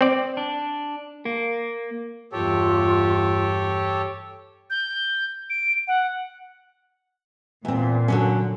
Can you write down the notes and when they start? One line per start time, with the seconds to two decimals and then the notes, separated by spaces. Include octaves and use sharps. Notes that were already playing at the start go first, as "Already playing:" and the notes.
0.01 C4 D5
0.37 D4
1.25 A#3
2.32 E2 G2 F4 G4 A4 C#5
4.70 G6
5.50 D7
5.88 F#5
7.65 E2 A#2 C4
8.08 D3 F#3 C#4